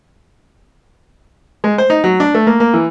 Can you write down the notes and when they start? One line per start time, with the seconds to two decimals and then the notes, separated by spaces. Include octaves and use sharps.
1.64 G#3
1.78 C5
1.90 D#4
2.04 F#3
2.20 D4
2.35 A3
2.47 A#3
2.60 A#3
2.74 E3